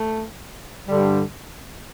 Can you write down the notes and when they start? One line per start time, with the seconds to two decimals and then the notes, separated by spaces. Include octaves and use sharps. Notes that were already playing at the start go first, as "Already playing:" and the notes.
Already playing: A3
0.88 G2 D3 G3